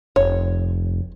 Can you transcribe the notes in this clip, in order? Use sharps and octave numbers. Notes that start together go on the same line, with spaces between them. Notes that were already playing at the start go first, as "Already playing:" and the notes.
F1 C#5